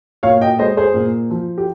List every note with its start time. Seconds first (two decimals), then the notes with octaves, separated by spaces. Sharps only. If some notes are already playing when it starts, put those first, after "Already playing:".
0.23 A#2 C#5 F5
0.41 D#5 G5
0.59 G#3 C5 D#5
0.77 G#4 C5
0.94 A#2
1.30 F3
1.58 G4